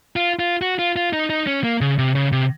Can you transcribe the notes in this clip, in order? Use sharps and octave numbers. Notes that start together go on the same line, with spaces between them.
F4
F4
F#4
F4
F4
D#4
D#4
C#4
A#3
C#3
C3
C#3
C3